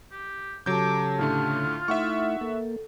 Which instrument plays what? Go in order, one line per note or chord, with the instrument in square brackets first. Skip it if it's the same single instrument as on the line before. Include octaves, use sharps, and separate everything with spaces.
[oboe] G4
[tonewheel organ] C#3 [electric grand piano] F#3 G6 [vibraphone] G4 A4 A5 [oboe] D6
[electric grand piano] A2 D3 A3 [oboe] F4
[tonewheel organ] A3 E4 [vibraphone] D#4 [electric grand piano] E5 F#5 C#6
[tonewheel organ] A#3 [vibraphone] A4